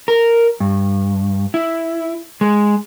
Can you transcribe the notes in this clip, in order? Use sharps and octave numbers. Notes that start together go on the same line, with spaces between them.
A#4
G2
E4
G#3